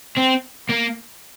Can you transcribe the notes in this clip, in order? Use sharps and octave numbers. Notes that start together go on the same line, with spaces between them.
C4
A#3